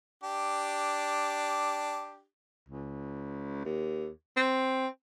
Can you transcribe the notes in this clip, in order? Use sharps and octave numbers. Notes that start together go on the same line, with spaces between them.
D4 G4
C#2
D#2
C4